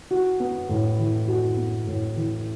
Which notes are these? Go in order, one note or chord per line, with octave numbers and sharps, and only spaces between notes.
F#4
B3
A2
E3
F#4
B3
A2
E3